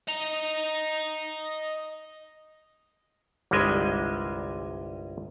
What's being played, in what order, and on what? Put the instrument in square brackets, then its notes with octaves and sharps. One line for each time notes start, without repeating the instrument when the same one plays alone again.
[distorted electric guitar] D#5 A#5
[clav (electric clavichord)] G1 C2 G3 G#3 D#5 G#5